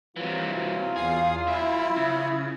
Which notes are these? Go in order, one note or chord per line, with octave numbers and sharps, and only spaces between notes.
C3 E3 F#3 F4
E2 G#4 F5
F#3 E4 E5
C#3